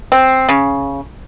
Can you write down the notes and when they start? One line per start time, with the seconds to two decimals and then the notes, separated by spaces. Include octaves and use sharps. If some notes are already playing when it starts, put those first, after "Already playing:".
0.12 C4
0.49 C#3